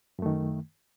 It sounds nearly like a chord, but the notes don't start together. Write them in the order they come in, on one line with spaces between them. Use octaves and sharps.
F#2 A3 D#3